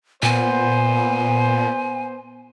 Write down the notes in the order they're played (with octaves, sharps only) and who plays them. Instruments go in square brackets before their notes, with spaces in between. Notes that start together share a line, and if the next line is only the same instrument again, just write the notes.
[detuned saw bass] A#2 [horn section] B3 C5 [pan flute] G#5